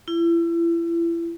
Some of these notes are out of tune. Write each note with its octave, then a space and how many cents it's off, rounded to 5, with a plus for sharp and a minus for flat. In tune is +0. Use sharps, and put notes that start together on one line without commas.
E4 +35